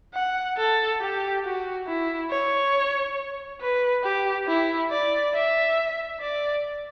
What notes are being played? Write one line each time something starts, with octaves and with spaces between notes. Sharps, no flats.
F#5
A4
G4
F#4
E4
C#5
B4
G4
E4
D5
E5
D5